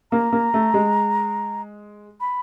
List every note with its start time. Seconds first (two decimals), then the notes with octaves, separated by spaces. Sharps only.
0.12 A#3 A#5
0.33 A#3
0.54 A3
0.74 G#3
2.20 B5